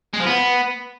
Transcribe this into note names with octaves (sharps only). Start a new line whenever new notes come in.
G#3
F3
B3